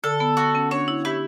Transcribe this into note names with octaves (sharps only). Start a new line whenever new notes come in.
D3 A4
B3
F#4
C#4
D4 C#5
E4
E4 G4